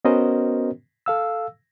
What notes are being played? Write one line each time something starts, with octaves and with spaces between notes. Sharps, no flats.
B3 C#4 F#4 A#4 C5 D#5
A4 F5 E6